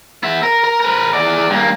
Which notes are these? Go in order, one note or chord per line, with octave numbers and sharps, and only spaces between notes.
B3 E5
A#4
A#4
A#4 B4
E2 D5
G2 A#3